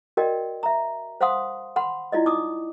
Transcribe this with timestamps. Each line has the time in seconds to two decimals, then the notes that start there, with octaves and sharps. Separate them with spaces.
0.17 F#4 A#4 D5 D#5 G5
0.63 E5 A#5
1.21 C5 F5 F#5 C6 D#6
1.76 F#5 B5 C6
2.12 E4 F4 D5 D#5
2.25 D#4 D6 D#6